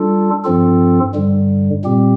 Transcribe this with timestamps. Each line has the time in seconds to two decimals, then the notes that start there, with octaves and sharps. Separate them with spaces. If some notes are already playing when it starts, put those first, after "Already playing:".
Already playing: G3 D4 F4 A4
0.44 G2 F3 C4 F4 A4
1.14 G2 D3 G3
1.84 A#2 G3 C4 G4